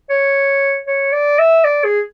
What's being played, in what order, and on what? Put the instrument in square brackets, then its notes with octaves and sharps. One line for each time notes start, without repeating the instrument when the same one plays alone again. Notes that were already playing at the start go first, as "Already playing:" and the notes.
[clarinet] C#5
C#5
D5
E5
D5
G#4